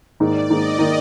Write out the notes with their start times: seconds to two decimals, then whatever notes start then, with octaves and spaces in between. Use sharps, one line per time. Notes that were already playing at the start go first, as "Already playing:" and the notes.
0.20 G#2 D#3 A#3 D#4 D5
0.49 G#2 D#3 A#3 D#4 D#5
0.79 D#3 A#3 D#4